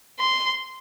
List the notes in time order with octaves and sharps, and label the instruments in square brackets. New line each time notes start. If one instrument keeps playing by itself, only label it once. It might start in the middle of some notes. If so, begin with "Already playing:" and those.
[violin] C6